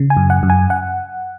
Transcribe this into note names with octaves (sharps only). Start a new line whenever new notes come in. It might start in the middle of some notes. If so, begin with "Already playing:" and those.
Already playing: C#3
G#5
F#2
F#5
F#2
G#5
F#5